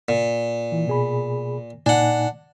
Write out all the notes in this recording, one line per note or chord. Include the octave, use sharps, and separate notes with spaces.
A#2
E3
B2 G#4 B5
A#2 D4 D#4 F#5 G#5